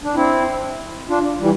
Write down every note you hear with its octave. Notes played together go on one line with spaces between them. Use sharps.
D4
C4 E4
D4 F4
E3 G3